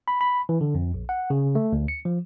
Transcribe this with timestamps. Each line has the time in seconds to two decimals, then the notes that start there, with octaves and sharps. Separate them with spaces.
0.08 B5
0.21 B5
0.49 E3
0.61 D3
0.75 F2
0.94 A#1
1.09 F#5
1.30 C#3
1.55 A3
1.72 D2
1.88 C#7
2.05 F3